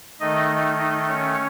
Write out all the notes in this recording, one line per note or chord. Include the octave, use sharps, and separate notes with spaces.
D#3 A3 D#4 D#5
D#4 D#5
C#4 C#5